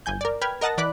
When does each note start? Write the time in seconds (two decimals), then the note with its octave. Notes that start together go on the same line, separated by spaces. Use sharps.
0.06 G1 G#5 G6
0.21 A#4 D5
0.41 B4 G5 B5 F6 G#6
0.61 A#4 D#5 F#5 A5 A#6
0.78 E3 D5 B5 D6 F#6